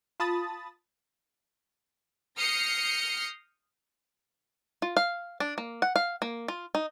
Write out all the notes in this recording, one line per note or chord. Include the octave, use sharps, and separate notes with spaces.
F4 A5 B5 D#6 A6
D#6 F6 G6 A#6 C7 C#7
F4
F5
D4
A#3
F#5
F5
A#3
F4
D#4